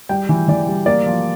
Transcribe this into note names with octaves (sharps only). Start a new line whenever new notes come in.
G3 G5
E3
E3 D5
G3
A#3 D5
F3